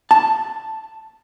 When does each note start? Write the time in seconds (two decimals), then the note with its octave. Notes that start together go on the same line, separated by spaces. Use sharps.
0.11 A5